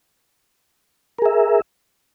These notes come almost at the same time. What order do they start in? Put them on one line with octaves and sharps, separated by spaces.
A#4 G#4 E5